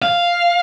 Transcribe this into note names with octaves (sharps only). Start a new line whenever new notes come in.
F5